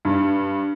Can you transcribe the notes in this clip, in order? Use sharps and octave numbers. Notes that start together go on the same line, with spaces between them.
G2